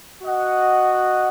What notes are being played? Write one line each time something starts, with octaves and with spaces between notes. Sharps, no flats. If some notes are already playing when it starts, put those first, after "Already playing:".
F#4 D#5 F#5